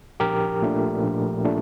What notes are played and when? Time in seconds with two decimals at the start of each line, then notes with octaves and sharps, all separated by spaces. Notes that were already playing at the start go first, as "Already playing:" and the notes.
0.20 A#1 G4 A#4
0.62 A#2 A3 D4
1.03 A#1
1.44 A#2 A3 D4